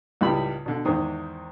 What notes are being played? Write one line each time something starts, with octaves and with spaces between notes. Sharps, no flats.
C#2 A2 G3 D#4 B5
B2 D3
E2 G#2 D#3 D#6